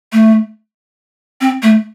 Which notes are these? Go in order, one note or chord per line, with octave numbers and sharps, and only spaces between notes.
A3
C4
A3